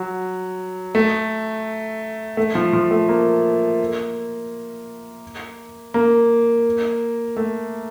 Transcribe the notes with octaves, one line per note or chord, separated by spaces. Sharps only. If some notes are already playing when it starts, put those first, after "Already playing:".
Already playing: F#3
A3
A3
F3
F3
A3
A#3
A#3
A3